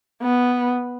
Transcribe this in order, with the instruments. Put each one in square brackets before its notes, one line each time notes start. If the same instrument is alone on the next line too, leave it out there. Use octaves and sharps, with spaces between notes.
[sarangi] B3